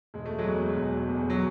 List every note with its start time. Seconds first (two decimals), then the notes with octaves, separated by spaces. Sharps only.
0.14 E1 G#3
0.26 A3
0.38 F#3 G#3
0.46 E2 B2
0.77 E1
1.09 E2 B2
1.30 F#3